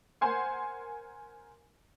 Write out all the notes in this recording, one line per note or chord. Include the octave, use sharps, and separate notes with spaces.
A#4 C5 F#5 G#5 C6